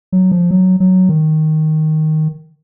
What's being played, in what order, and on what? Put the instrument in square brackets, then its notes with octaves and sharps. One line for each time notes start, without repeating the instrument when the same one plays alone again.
[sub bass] F#3
F3
F#3
F#3
D#3